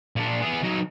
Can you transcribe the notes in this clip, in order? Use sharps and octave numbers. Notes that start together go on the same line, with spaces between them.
A#2 D4
B3 G#4
F#3 D#4